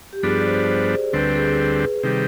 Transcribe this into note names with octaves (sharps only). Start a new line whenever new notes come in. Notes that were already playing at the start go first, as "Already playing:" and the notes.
G4
G2 F3 B3 D4 G#4
D5
C5
C5
D2 D3 G3 C4 B4
G#4
C3 D#3 G3